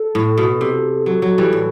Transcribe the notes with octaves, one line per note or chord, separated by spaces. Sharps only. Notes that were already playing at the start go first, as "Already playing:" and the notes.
Already playing: A4
A2
B2
C3
F#3 A4
F#3
E3 G3
A2